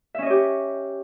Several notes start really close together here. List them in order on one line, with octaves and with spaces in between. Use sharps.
E5 C#4 D#5 C#5 G4